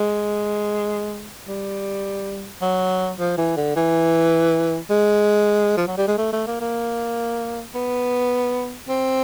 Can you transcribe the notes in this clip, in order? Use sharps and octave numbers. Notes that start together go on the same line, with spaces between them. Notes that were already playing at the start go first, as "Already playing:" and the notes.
Already playing: G#3
G3
F#3
F3
E3
D3
E3
G#3
F3
F#3
G3
G#3
A3
A3
A#3
A#3
B3
C4